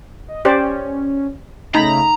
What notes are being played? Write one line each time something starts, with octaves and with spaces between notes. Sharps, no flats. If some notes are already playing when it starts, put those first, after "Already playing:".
D#5
C#4 G4 C5 D5
C#3 A3 D#4 A#5 B5